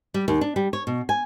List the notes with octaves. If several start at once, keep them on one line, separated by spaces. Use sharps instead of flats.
G3
D#2
D4
G3
C#5
B2
G#5